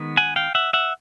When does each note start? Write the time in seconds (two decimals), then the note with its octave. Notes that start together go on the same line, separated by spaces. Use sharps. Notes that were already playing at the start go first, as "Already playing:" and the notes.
Already playing: D#3 G#3 B3
0.17 F#5 G#5
0.36 F5 G5
0.55 E5 F#5
0.73 E5 F#5